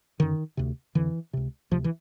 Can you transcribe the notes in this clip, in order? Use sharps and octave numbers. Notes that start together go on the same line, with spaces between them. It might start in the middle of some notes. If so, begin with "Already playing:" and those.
F#2 D3 D#3
D2 C3
F2 D3 E3
C#2 C3
D2 C3 F3
E3